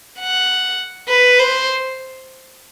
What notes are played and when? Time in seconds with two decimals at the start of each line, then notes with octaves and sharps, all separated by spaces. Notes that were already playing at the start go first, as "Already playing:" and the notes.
0.19 F#5
1.09 B4
1.39 C5